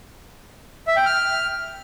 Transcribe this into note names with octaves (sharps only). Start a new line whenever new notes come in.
E5
G5
F6